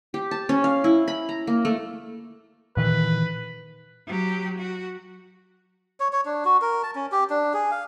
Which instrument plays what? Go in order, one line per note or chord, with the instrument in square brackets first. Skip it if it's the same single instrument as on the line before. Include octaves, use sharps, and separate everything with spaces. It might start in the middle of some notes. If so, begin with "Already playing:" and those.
[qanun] G4
A5
C#4
F5
E4
B5
A#5
A#3
A3
[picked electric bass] A#2 D#3 E3 [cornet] B4
[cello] F#3 G4
F#4
[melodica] C#5
C#5
D4
F#4
A#4
A5
C#4
G4
D4
G#4
F5